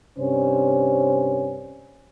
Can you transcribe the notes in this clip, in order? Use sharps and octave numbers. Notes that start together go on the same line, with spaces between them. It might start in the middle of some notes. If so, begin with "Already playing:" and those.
G2 C3 C#4 C5